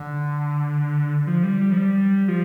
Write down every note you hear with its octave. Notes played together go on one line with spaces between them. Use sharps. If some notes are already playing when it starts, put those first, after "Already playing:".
Already playing: D3
F3
G3
G3
F3
G3
F3